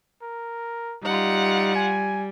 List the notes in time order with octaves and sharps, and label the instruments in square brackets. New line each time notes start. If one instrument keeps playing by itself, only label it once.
[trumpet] A#4
[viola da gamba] G3 [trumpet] D#4 [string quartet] F4 F#5
[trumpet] G#5